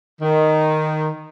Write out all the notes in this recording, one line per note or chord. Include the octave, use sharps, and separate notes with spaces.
D#3